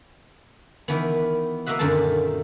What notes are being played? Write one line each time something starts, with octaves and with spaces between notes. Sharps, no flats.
D#3 E3 B3
A#3 F#4 D#5 E5 F#5
F#2 A#2 D3 D#3 A3 A5